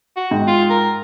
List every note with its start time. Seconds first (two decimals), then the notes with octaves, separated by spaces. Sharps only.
0.17 F#4
0.31 G#2 G5
0.48 F4
0.70 A#4